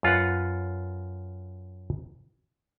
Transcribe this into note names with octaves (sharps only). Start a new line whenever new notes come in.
F#2 F4 B4 F#5